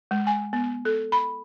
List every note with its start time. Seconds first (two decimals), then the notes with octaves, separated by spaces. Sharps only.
0.11 G#3
0.27 G#5
0.53 B3
0.85 A4
1.12 B5